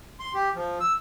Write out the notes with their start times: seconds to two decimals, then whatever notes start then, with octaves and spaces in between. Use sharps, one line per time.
0.20 C6
0.34 G4
0.55 F3
0.80 E6